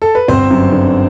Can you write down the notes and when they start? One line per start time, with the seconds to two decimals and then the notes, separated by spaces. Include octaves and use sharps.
0.02 A4
0.15 B4
0.28 G1 C4 C5
0.51 F#2
0.72 D3